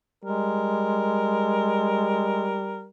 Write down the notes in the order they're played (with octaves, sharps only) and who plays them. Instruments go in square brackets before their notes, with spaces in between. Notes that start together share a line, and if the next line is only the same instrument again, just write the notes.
[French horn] G3 [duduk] G#3 [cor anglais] A#4